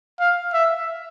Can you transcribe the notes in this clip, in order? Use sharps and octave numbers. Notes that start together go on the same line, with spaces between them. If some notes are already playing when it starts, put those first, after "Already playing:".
F5
E5